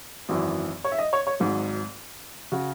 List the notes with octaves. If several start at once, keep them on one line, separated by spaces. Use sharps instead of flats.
G#1 F#2 E3
C#5
E5
D#5
C#5
C#5
G#1 G#2 F#3
C#3 F#4